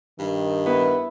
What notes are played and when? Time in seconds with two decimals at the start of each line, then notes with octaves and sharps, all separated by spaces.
0.19 G2 D#3
0.66 B3 E4